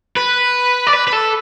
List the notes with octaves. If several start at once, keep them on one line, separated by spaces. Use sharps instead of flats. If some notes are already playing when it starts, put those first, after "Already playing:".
B4
D5
B4
B4
A4